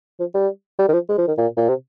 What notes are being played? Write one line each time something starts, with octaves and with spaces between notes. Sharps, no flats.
F3
G3
G3
D#3
F3
G#3
F3
D#3
A#2
A#2
C3